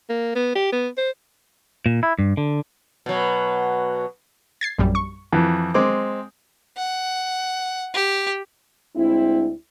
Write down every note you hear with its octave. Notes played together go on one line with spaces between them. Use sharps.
A#3
B3
G4
B3
C5
A#2
E4
G2
D3
B2 F#3
G#6 A6 C7
A#1 F#2 G3
C#6
F2 E3
G#3 C4 D6
F#5
G4
D2 G#3 C4 E4